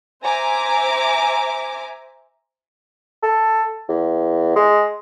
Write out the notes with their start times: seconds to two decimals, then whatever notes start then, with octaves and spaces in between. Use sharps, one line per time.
0.22 C5 E5 G#5 A#5 D6
3.23 A4
3.89 E2
4.56 G#3